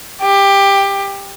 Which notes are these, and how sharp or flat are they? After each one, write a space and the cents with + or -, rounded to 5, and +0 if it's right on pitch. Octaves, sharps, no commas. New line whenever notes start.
G4 +15